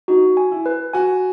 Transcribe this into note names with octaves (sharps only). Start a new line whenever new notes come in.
D#4 F#4
G#5
E4
B4
F#4 G#5